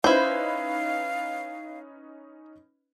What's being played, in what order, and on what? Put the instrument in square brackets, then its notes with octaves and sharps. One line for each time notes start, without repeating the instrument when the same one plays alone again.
[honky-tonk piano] C#4 D#4 B4 [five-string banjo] E4 C5 [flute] F5